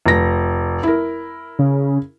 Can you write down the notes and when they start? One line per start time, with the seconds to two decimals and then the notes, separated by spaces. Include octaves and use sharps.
0.06 F1 A#6
0.83 E4 A#4
1.59 C#3